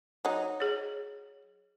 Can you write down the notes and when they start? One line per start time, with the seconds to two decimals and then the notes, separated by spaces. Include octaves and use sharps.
0.25 F#3 D#4
0.60 G#4 C#5